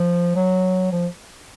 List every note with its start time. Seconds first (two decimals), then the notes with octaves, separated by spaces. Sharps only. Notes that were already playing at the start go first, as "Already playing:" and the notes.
Already playing: F3
0.36 F#3
0.92 F3